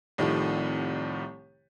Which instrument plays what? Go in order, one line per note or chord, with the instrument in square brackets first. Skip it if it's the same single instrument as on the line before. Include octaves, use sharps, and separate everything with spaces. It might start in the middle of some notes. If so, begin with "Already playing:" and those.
[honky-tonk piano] C2 A2 C3 D#3 F3